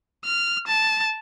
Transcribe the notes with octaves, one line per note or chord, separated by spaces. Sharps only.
F6
A5